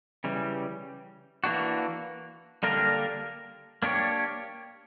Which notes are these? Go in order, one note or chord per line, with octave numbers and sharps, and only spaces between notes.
C#3 E3 G3
E3 A#3 D4 F#4
D3 G3 A#3 D4 A#4
A#3 D4 G4 C#5